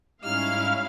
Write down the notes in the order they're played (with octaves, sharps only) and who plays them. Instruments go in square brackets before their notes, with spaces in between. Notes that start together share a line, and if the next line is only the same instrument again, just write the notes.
[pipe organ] G#2 G3 D#4 [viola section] C#4 E4 F5 [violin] F6